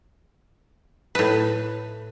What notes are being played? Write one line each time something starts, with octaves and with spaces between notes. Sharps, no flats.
A2 B4